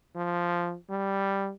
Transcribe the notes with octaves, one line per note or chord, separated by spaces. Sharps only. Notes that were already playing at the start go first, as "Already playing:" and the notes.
F3
G3